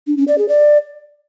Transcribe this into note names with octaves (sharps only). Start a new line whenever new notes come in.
D4
C#4
D5
G#4
D5